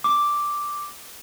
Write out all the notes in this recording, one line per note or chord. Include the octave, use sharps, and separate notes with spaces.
D6